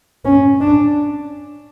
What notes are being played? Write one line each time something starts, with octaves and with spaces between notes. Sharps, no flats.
C#4
D4